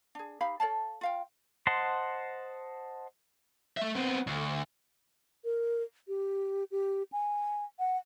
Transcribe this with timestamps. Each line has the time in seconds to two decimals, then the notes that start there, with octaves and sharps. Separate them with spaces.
0.15 D4 G#4
0.41 D#4 G4 F5 B5
0.60 A4 C#5 F5 A5
1.01 F4 F5 G5
1.67 C5 D#5 F#5 A5 C6
3.77 A3 E5
3.95 B3 C4
4.27 D2
5.45 A#4
6.08 G4
6.71 G4
7.12 G#5
7.79 F#5